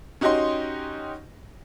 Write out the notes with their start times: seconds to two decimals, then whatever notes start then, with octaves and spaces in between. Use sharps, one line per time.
0.21 C#4 D#4 F#4 G4 D#5 C6